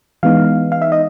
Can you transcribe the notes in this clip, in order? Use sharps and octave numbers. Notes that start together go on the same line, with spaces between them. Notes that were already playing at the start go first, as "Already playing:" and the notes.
E3 G#3 B3 D#4 F5
F5
E5
D#5